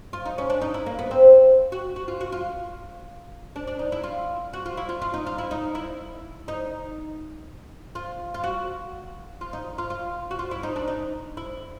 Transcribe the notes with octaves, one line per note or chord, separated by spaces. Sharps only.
F4
D#4
C#4
D4
D#4
E4
A#3
B3
C4
F#4
F#4
F4
F#4
F4
D4
D4
D#4
E4
F4
F#4
F4
E4
F4
F4
D#4
F4
E4
D#4
E4
D#4
F4
F4
F#4
F4
D#4
F4
F4
F#4
F4
E4
D#4
D4
D#4
E4